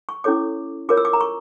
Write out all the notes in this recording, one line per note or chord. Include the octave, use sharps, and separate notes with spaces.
C#6
C#4 E4 A4 C#5 D6
F4 A#4 C#5 D6
E6
D6
A#5
C#6